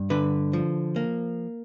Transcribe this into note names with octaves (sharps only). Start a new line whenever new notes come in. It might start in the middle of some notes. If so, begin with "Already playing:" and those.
Already playing: G2
D3 B4
F3
A#3